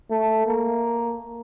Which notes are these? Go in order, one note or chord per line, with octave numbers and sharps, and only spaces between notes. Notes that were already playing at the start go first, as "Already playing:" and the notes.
A3
A#3